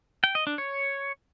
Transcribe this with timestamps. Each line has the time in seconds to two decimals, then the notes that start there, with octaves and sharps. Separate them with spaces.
0.24 G5
0.35 D#5
0.47 D4
0.58 C#5